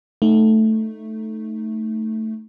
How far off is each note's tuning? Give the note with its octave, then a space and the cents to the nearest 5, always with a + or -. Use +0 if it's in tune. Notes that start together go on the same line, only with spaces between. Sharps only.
A3 +0 D#4 +0